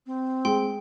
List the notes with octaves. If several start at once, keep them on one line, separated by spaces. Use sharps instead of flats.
C4
G#3 G5 C6